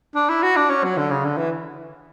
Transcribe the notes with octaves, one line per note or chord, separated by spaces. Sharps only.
D4
E4
F#4
D4
C#4
F#3
D3
C#3
D3
E3